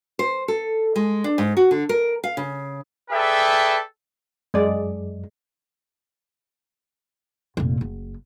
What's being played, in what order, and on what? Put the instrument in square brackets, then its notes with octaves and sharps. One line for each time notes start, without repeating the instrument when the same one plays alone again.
[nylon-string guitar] C5
A4
G#3
D4
G#2
F#4
D3
A#4
F5
C#3
[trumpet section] G#4 A4 B4 D5 E5 G5
[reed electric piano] F#2 [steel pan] G#3 D5
[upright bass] F1 A#2
F#1